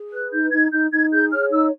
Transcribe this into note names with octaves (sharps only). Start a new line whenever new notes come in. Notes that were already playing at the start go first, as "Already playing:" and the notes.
Already playing: G#4
B4 F#6
D#4 G6
D#4 G#6
D#4 G6
D#4 G#6
G#4 G6
C#5 F6
D#4 E6